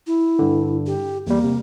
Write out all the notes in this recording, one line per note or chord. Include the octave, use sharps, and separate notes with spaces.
E4
G2 D3
G4
E2 G3 A#3
C3